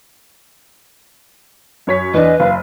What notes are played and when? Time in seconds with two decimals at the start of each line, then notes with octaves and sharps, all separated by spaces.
1.87 F#2 C#5 B6
2.14 E2 D4 B4 D#5
2.40 F#1 F5